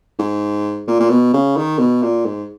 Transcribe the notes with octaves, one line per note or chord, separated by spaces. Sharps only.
G#2
A#2
A#2
B2
C#3
D#3
B2
A#2
G#2